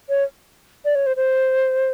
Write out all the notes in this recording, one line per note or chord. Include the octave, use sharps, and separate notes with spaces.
C#5
D5
C#5
C5
C5